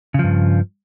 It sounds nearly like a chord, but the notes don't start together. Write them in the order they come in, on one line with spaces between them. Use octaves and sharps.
C#3 F3 G2